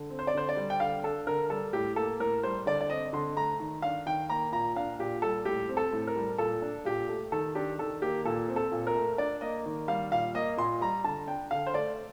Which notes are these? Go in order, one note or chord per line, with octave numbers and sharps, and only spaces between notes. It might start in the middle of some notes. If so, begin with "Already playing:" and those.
Already playing: D3
C4
C5
D5
D3 C5
D5
G3
G5
D3 F5
D4 A4
D3 A#4
G3 A4
A2 G4
A#3 A4
A2 A#4
G3 C5
D3 D5
D5
C4 D#5
D3 C6
A3 A#5
D#3
D4 F5
D#3 G5
A#3 A#5
A#2 A#5
D4 F5
A#2 G4
G3 A4
A2 G4
C4
A4
A2
A#4
G3
A#2 A4
D4
A#2 G4
A3
D#3 A4
D4 G4
D#3 A4
A#3 G4
A#2 A4
C4
A4
A#2
A#4
A3
D4 D5
A#3 D#5
D#3
G3 F5
A#2 F5
A#3 D#5
A#2 C6
G3 A#5
D3 A5
D4 G5
D3 F5
C5
A3 D5